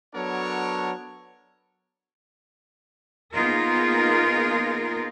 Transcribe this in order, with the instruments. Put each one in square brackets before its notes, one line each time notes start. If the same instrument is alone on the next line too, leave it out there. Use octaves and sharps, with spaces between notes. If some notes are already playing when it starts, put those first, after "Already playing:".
[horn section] F#3 B3 D4 A4 A#4 C#5
[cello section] A#3 B3 D#4 F4 G#4 A#4